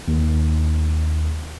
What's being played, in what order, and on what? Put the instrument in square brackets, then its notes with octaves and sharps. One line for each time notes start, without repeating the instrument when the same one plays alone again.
[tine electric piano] D#2